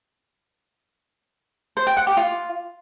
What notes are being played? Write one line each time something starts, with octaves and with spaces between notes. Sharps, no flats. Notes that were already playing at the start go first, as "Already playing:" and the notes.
C5
G5
F#5
G4
F4